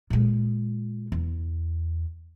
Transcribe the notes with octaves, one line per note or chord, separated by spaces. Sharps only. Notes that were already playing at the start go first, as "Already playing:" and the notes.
A#2 G#3
E2